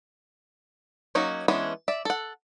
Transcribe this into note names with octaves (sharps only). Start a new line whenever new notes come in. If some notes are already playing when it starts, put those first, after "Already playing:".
F#3 A#3 C#4 D#4 F#4
E3 G#3 B3 C#4 D4
D5 E5
A4 F#5